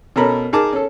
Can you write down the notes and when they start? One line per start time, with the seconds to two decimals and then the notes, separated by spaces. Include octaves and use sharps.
0.16 B2 C#4 A4 A#4 A#5 B5
0.53 D#4 G#4 A#4 A5 D6
0.73 C#4 A4